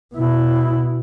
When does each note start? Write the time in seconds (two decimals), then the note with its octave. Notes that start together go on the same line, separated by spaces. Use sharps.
0.15 B2 E4